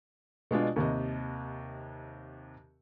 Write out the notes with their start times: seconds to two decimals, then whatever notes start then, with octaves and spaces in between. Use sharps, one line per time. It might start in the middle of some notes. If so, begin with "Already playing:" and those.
0.51 B2 G#3 D4 F4
0.76 D#2 C3 D#5